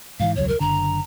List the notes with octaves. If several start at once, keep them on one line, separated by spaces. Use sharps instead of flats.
G#2 D#3 E3 F5
E1 C#2 F#3 C#5
A#4
F#1 D3 A#5